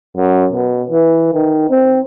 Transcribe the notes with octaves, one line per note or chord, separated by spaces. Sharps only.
F#2
B2
E3
D#3
C4